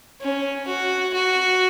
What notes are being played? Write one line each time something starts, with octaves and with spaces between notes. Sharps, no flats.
C#4
F#4
F#4